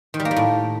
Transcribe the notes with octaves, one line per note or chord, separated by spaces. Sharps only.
D#3
G3
A#3
G3
A2